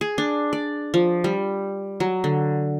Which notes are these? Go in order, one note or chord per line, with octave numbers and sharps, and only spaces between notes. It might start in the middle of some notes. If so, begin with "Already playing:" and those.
G#4
D4
D5
F3
G3
F#3
D3